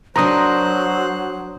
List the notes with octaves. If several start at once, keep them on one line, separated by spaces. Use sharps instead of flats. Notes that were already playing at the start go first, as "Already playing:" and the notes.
F#3 D4 A#4 C5 A#5 C6 D#6 F#6